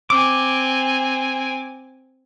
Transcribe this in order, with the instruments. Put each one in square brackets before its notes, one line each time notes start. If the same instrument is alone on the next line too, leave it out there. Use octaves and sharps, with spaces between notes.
[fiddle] C4 G#5 [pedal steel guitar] D6